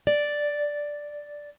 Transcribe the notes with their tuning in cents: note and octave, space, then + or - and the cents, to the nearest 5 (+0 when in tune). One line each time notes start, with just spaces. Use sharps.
D5 +0